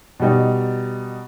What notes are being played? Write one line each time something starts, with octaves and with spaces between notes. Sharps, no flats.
B2 G3 D#4